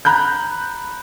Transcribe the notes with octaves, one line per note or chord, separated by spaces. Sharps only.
A#5 B5 F#6 G6